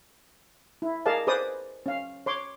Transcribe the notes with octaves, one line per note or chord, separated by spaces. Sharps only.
E4
G#4 A#4 D5 D#5 F5 A5
G#4 B4 C5 D5 D#6
C#4 F5
C#5 C6 D6